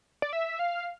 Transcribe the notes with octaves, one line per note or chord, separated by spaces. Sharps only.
D5
E5
F5